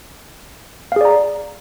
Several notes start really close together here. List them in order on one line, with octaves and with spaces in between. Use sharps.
F5 G#4 D5 A#5